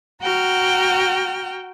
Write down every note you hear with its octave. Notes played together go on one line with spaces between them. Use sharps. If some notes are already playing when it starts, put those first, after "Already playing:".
F#4 G5 A#5 F6